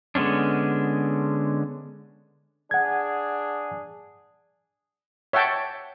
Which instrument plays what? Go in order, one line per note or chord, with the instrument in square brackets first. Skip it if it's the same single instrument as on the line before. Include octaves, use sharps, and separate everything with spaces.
[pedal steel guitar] D3 G#3 B3 C#4 D4
[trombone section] D4 G#4 [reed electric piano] F#5 G#6
[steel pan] C#5 E5 F#5 G5 A5